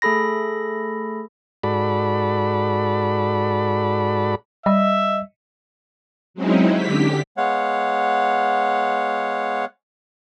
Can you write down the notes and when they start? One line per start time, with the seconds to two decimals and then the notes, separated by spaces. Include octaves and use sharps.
0.02 A3 G#4 A4 B5 A#6
1.63 G#2 F#4 A4 D5 B5
4.66 G3 D#5 E5
6.34 F#3 G#3 C4 C#4 D#4 E4
6.74 D3 G4 B6
7.37 G#3 B3 C#5 F5 F#5